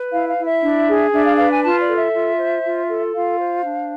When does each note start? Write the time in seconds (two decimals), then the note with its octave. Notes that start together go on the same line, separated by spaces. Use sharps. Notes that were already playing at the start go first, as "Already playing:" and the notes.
Already playing: B4
0.12 E4 F5
0.29 F5
0.37 E4
0.45 E5
0.63 D4
0.88 G#4
1.13 D4 E5
1.25 F5
1.37 B4 F5
1.51 G#5
1.63 F4 A5
1.80 D5
1.88 A4
1.97 E5
2.13 F4
2.38 C5
2.63 F4
2.89 A4
3.14 F4 F5
3.39 C5
3.64 D4